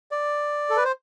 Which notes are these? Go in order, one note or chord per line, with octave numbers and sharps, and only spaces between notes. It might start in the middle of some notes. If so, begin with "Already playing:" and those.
D5
A4
B4
C5